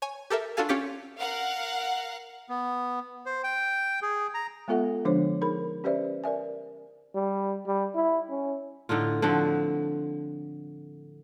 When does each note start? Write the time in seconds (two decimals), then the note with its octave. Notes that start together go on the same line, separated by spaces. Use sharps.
0.02 C#5 G#5
0.30 G4 A4 A#4 E5
0.57 D4 F4 F#4 A4 F5 G#5
0.69 C#4 F4 G4 D6 B6
1.18 A#4 F5 F#5
2.49 B3
3.26 C5
3.44 G5
4.02 G#4
4.34 A#5
4.68 G#3 B3 F4 A4 E5 F#5
5.05 D3 F3 G#3 D4 C5 C#5
5.41 D#4 G#4 A#4 B5
5.84 C#4 G4 B4 C5 D5 E5
6.24 A#4 D5 E5 G#5
7.15 G3
7.67 G3
7.95 E4
8.30 C#4
8.89 A2 D3 D#4 F4
9.22 D3 F3 C4 F#4